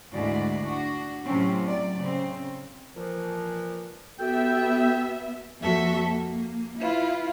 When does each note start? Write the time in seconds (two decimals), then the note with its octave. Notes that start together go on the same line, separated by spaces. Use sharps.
0.12 D2 G#2 E3 G#3 F#4 D5
0.65 D4 F#4
1.25 A2 C3 F#3 C4 C#4
1.66 F#3 D5
1.98 C#3 C4
2.94 A#2 E3 F3
4.19 B3 F#4 G4 A4 E5 G5
5.59 F2 A#3 F#4 A4 E5
6.05 A#3
6.78 E4 F4 B4